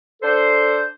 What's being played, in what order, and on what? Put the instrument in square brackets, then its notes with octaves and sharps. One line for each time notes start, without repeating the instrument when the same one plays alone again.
[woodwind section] D4 A4 C5